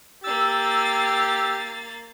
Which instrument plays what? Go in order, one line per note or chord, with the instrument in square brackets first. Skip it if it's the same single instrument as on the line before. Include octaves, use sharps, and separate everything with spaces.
[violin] A#3 A6 [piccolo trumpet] G4 [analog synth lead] E6